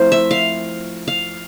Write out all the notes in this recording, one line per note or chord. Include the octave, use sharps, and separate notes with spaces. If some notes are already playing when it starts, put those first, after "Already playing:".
Already playing: F3 A3 C4 E4 A#4 C5
E5
F5
F5